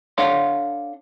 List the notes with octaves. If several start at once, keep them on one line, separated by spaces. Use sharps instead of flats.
D4 A4 C#5 F5 F#5 C6